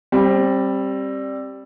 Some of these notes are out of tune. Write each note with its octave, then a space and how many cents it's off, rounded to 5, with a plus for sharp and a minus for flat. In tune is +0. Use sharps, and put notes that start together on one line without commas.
G3 +0 C4 +25